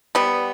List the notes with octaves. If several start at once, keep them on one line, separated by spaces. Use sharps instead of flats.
G3 B3